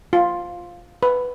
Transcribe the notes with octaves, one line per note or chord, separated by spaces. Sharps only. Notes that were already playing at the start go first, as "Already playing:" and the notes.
F4
B4